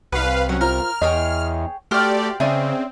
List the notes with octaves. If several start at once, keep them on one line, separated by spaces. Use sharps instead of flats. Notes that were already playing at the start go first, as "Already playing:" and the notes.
C2 B4 F5 F#5
F#3 C#4 F#5
F4 A#4 C5 F6
E2 G#4 C#5 D#5 G5
A3 F#4 G4 C5 D5 G5 F6
C#3 C4 C#4 G#4 D5 E5